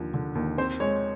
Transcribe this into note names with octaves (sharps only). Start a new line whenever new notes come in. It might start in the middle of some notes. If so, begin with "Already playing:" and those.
Already playing: D#2 D3 F3
D3
D#2
C4 C5
G#3 C#5